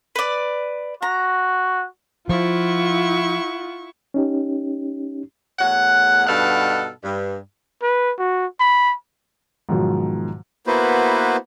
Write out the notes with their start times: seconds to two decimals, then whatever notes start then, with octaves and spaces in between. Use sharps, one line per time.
0.16 B4 D5
1.02 F#4 A#5
2.29 F3 E4 F4 F#5 C#6
4.14 C#4 D#4 G4
5.59 E2 A3 C#5 F#5
6.27 G2 B2 D#4 A4 F5 F#5
7.03 G2
7.83 B4
8.19 F#4
8.60 B5
9.69 G#2 B2 D#3 F3 F#3
10.67 A#3 B3 E4 F#4 B4 C5